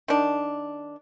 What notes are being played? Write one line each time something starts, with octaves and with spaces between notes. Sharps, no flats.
D#3 D4